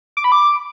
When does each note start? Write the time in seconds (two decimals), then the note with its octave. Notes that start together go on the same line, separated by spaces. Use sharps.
0.17 D6
0.24 B5
0.32 D6